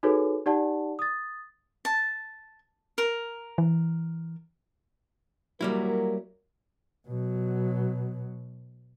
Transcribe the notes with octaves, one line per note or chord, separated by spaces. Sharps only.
D#4 F#4 G#4 A4 B4 C#5
D#4 G4 D5 F#5 A5
D#6 A6
A5
A#4
E3
F#3 G3 A#3 E4 A#4
B2 F#3